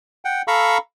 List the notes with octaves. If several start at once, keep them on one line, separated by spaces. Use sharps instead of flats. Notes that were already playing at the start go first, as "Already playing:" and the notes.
F#5 G5
A4 F5 A#5 B5 C#6 E6